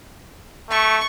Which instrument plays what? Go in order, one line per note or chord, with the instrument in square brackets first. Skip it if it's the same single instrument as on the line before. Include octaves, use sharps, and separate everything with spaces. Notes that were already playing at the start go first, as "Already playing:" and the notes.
[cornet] A3 [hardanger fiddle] C#6